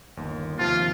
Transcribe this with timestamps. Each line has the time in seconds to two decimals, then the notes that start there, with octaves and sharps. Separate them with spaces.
0.17 G1 D#2
0.59 D#2 C3 F3 F4